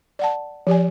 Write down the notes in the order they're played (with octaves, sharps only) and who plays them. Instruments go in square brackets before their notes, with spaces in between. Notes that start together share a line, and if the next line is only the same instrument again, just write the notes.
[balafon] D5 F#5 A5
F3 G4 D5 G#5